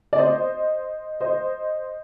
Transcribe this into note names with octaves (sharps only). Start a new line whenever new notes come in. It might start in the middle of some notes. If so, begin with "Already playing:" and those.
D5
C5 D#5
C5 D#5